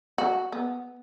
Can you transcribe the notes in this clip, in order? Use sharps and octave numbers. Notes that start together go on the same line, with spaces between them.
F#4
B3